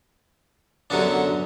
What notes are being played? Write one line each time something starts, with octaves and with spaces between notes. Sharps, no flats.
F#2 D3 F#3 B3 D4